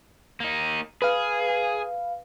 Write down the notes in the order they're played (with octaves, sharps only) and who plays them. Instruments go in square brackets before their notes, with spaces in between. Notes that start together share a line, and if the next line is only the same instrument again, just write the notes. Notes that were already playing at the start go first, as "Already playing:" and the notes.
[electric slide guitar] A#3 D#4
[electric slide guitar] G#4 [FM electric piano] B4 F5